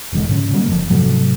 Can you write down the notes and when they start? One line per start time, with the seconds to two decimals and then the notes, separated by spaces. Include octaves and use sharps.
0.13 E1 D#3 G#3
0.28 G#2 C#3
0.53 F#3 G3 A#3
0.67 F1 F3
0.90 G#2 C3 F#3 A3